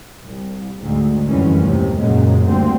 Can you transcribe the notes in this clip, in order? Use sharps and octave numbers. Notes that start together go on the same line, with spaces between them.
C2
D2 G#2
F1 C2 F#2 E3 G#3 C#4
D#2 A2 C3
F#2 A#2 C#3 F#3 G#3
D2 G2 D3 A#3 C4